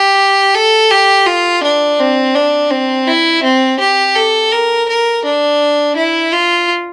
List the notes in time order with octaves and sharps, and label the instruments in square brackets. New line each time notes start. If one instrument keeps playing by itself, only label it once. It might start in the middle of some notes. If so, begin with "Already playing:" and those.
Already playing: [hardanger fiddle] G4
A4
G4
F4
D4
C4
D4
C4
E4
C4
G4
A4
A#4
A#4
D4
E4
F4